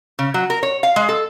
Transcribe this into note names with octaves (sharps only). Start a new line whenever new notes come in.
C#3
F#3
A#4
C#5
F5
G#3
A4